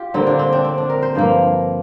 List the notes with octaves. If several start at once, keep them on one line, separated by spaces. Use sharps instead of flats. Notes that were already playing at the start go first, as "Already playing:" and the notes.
Already playing: F4 G4
D3 G3 A#3 C4
D4
C4
D4
C4
D4
A#4
C5
G2 F3 A#3